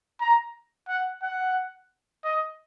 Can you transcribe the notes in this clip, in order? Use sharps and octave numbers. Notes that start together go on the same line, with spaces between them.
A#5
F#5
F#5
D#5